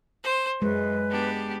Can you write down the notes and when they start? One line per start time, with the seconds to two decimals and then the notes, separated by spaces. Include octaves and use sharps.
0.22 C5
0.62 F#2 G#3 B4
1.10 B3 D4 G4